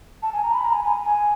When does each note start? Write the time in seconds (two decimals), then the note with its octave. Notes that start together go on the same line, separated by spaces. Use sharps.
0.23 A5
0.33 G#5
0.43 A#5
0.54 B5
0.64 A#5
0.74 G#5
0.84 G#5
1.05 G#5